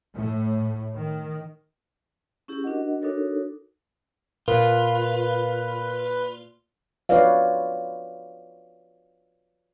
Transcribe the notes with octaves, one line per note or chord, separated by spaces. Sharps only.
A2
D#3
C#4 E4 G4 G#4
D4 F#4 A#4 D#5 F#5
D4 D#4 F#4 A4 A#4 C#5
A#2 F4 A#4 B4
F4 F#4 B4 C#5 D5 F5